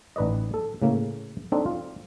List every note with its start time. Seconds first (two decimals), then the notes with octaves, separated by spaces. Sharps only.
0.16 A1 D#4 B4 D5 D#5
0.54 A4
0.82 A2 C#3 A#3
1.52 C4 D4 D#4 A4
1.66 F4